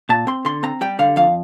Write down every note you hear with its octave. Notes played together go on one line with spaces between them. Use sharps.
A#2 A5
C4 C6
D3 C6
C4 A#5
G3 G5
D3 F5
F2 F5